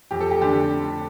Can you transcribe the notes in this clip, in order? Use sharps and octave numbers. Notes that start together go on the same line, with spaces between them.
F2 G4
A4
G4
D3 A3 D4 G4